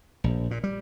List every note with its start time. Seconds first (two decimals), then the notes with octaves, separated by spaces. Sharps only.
0.24 A#1
0.51 A#2
0.64 G3